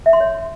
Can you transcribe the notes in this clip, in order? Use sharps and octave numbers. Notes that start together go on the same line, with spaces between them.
E5
C6
C#5